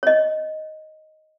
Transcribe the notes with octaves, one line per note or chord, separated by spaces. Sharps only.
C#5 D#5